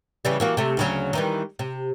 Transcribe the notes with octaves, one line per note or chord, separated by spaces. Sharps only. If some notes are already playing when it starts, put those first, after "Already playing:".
C#3 E3 G3
E3 A#3 F#4
C3 A3
D2 C#3 F#3
D#3 E3 G3
C3